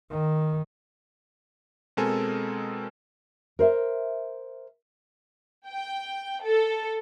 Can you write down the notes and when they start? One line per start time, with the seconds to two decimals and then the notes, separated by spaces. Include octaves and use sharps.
0.11 D#3
1.97 B2 G#3 C4 A4 A#4 G#5
3.59 A#4 C5 E5
5.68 G5
6.42 A4